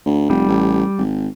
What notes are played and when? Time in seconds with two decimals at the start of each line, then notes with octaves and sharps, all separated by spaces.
0.06 D2
0.30 F1 G3
0.48 A1
0.97 G#1